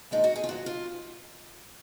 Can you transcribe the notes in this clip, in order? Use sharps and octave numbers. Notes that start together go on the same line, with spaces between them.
A#2 F3 G#3 D#4
F#4
G#4
F4
G#2 D#3 F#3 F#4
F4